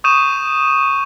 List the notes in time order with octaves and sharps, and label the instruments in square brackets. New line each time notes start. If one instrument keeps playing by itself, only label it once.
[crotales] C#6 D#6 G6 D#7 E7